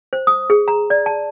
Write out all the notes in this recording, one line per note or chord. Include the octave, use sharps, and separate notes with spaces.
C5
D#6
G#4
A#5
D5
A5